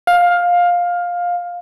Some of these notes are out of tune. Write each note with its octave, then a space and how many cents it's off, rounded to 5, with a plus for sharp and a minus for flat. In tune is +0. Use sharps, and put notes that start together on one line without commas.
F5 +15